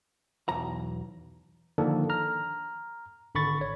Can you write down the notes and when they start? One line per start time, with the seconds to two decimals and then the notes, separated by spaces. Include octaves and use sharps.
0.49 B1 E2 A#5
1.78 D3 D#3 F3 A#3 D4 A4
2.10 A#5 F6
3.35 G#1 D3 B5 C#6 A6
3.61 C#5